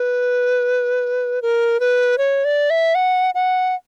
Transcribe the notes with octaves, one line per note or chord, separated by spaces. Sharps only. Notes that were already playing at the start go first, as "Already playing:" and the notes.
Already playing: B4
A#4
B4
C#5
D5
E5
F#5
F#5